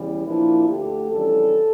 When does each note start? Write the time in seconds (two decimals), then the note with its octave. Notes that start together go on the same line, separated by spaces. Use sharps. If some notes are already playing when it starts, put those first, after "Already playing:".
Already playing: E2 C#3 E3 G3
0.26 A#2 F3 A#3 D4 E4
0.69 D2 D3 A3 G4
1.11 F2 C#3 E3 G3 D4 A4